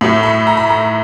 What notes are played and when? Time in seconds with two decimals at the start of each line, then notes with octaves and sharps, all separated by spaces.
0.01 A2 F#3 A3
0.23 B5
0.47 A#5
0.57 B5
0.69 A#5